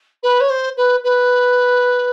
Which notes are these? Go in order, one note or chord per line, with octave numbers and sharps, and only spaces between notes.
B4
C#5
C5
B4
B4